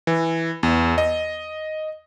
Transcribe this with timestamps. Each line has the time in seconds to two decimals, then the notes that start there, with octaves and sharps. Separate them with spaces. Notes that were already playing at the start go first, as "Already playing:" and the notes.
0.07 E3
0.63 E2
0.98 D#5